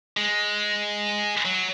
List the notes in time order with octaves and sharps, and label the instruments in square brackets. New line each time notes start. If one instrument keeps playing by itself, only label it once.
[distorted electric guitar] G#3
F#3